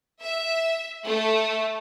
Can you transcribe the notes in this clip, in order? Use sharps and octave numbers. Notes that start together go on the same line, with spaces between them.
E5
A3